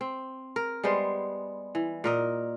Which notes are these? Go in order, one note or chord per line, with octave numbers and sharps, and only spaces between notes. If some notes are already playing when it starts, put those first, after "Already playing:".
C4
A#4
G3 G#3 B3 C5
E3
A#2 A#4 D#5